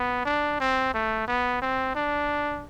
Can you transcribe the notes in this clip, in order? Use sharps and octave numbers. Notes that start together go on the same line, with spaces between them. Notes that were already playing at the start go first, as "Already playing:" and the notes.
Already playing: B3
D4
C4
A3
B3
C4
D4